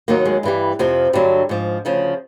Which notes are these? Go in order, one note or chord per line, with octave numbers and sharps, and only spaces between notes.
D#2 D#3 F#3 A#3
G#3
G2 E3 G3
F2 C3 F3
G2 D3 F#3 G3
G#2 F3
D2 C#3 F3